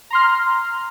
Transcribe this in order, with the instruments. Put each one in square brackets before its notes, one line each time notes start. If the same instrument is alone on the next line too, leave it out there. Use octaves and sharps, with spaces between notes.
[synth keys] A#5 C6 F6